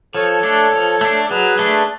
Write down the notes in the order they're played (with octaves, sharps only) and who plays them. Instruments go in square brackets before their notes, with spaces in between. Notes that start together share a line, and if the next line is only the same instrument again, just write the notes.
[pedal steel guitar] F3 [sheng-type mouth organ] A4 C#5
[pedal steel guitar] A3 D4
F3
A3 D4
[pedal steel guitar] F#3 [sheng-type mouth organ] G#4 B4
[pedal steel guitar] A3 D4